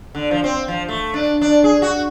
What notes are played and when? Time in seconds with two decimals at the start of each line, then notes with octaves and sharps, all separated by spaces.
0.15 D3
0.31 F3
0.44 C4
0.68 F3
0.89 A3
1.14 D4
1.41 D4
1.64 G#4
1.82 F#4